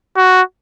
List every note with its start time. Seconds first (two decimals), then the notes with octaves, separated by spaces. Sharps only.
0.16 F#4